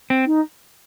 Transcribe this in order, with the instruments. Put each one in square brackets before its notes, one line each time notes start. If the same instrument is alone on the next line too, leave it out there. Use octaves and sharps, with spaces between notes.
[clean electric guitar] C4
[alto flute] D#4